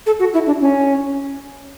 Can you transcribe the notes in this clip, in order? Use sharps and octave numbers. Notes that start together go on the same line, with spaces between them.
A4
F#4
E4
D4
C#4